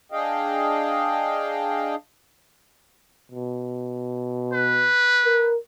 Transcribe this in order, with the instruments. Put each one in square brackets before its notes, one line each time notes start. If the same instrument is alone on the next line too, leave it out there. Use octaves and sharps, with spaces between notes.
[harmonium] D4 G#4 D#5 F5 G5
[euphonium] B2
[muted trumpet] B4
[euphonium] A#4